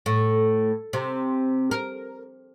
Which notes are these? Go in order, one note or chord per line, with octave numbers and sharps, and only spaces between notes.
A2
C3
A#4